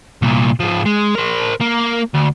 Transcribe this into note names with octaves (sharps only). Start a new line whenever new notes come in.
C2 A#2
G#2 F3
G#3
A#4 C5
A#3
D2